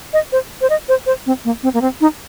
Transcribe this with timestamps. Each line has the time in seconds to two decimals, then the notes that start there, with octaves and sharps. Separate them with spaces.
0.13 D#5
0.32 C5
0.61 C5
0.70 D#5
0.89 C5
1.06 C5
1.26 C4
1.45 A#3
1.63 C4
1.74 A#3
1.81 C4
2.01 D#4